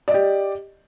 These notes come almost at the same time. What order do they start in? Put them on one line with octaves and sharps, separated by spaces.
D5 D#5 G4